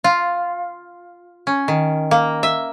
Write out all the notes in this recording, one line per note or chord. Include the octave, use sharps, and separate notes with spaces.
F4
C#4
D#3
A#3
E5